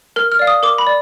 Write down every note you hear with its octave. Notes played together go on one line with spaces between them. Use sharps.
A#4 F6
F6
D5 F5
D#6
A#4 D6
B5
D5